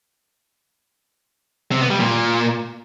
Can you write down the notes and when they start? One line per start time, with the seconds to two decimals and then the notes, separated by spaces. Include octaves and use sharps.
1.72 C3
1.81 B3
1.90 G3
2.00 A#2